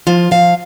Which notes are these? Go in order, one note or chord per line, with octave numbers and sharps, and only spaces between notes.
F3 F4
F3 F5